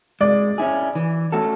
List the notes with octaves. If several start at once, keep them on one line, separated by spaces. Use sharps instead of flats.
G#3 D5
C#4 E4 G#4
E3
A3 C#4 F#4 A4